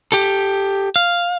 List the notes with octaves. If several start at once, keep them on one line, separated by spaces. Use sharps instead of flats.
G4 A4
F5